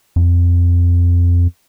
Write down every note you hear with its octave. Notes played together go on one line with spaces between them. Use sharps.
F2